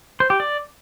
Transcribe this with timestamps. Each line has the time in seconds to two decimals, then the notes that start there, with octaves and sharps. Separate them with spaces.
0.20 C5
0.30 G4
0.40 D5